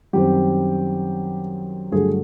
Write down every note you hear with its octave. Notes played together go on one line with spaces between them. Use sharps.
F#2 D#3 G3 C4 G4
G2 D3 F#3 A3 G#4